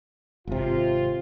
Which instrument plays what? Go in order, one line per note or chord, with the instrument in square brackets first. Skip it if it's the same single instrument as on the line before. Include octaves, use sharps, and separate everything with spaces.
[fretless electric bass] G#1 C3 [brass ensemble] F4